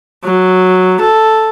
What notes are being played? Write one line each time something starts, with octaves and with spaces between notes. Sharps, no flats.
F#3
A4